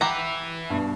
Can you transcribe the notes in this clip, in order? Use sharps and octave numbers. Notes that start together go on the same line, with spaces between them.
G4 B4 E5 F#5 A#5
G2 B2